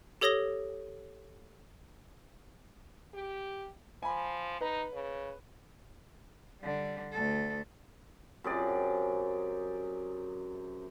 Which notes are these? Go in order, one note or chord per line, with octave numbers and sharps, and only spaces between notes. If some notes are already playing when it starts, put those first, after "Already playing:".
G4 A4 C#5 D#6 A#6 G7
G4
F3 G#5 B5
D#4 B4
C#3
D3 G3
D2 A4
F#2 C3 G#4 D5